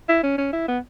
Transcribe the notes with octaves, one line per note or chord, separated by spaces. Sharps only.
E4
C#4
C#4
E4
B3